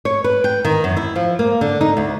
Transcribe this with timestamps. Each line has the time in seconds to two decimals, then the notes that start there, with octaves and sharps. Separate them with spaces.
0.05 C#5
0.24 B4
0.44 G5
0.65 D#3
0.84 F#2
0.97 E4
1.16 F3
1.39 A#3
1.61 D3
1.81 D#4
1.97 D2